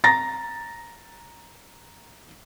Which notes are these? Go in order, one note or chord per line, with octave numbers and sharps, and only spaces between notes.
A#5 A6 A#6